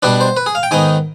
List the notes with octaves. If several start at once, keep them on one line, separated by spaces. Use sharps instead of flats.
B2 G3 B3 D4 B4
C5
B4
G#4
F5
G5
G#2 D#3 B3 D#4 G#5